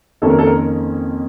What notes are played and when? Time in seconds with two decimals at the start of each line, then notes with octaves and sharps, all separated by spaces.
0.22 F2 D#3 A#3 C#4 A4
0.30 A#4
0.39 A4
0.46 A#4